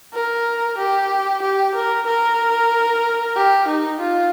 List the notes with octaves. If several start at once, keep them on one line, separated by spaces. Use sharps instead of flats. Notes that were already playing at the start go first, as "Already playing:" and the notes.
A#4
G4
G4
A#4
A#4
G4
D#4
F4